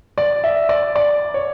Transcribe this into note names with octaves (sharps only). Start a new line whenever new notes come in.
D5
E5
D5
D5
C#5